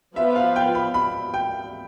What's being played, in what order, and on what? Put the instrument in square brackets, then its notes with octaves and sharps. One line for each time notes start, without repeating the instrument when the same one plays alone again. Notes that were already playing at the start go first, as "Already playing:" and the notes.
[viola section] F3 B3 F4 B4 [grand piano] E5
[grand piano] F5
G5
B5
B5
G5